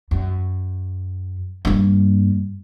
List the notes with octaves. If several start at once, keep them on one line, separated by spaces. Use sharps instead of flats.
F#2
G2 A#3